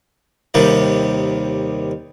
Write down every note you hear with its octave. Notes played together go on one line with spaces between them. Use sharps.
D#2 C3 D#3 G3